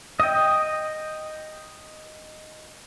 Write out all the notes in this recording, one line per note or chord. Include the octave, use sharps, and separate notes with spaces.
D#5 G5